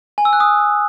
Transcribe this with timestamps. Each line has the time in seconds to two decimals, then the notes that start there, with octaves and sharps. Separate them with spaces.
0.18 G#5
0.25 E6
0.33 F#6
0.40 D#6